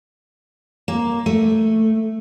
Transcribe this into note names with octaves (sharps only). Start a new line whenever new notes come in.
A#3
A3